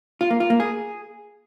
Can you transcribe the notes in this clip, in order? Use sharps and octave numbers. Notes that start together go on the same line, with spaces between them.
F4
A#3
F4
A#3
G#4